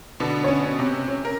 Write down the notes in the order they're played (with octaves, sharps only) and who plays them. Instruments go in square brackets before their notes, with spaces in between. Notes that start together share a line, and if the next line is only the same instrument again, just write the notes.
[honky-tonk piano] B2 D3 B3
[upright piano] C#4 C#5
[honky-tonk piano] C3
[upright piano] C#4
[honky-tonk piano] A#4